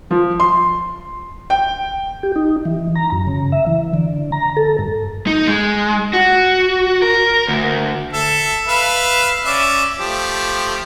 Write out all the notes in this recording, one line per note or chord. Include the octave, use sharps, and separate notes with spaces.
F3
C6
G5
G4
D#4
E3
A#5
F#2
C#3
E5
E3
D3
A#5
A4
G2
D#4
G#3
F#4
A#4
D2
A4 E5
B4 E5 F5
C#4 D5 E5
F3 A3 G4